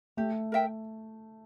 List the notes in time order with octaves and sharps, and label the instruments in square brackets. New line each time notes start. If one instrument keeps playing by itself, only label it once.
[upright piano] A3 [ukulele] G4
[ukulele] A#4 E5 G5